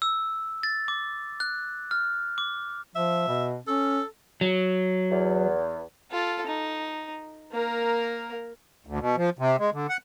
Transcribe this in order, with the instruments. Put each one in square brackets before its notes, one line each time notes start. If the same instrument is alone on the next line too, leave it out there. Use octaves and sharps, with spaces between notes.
[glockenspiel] E6
A6
D6
F#6
F6
D6
[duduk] F3 [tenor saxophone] E5
[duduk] B2
[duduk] C#4 [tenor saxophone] A4
[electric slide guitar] F#3
[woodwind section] E2
[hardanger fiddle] F4 A4
D#4
A#3 A#4
[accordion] D2
B2
F3
C3
G#3
D3
F#5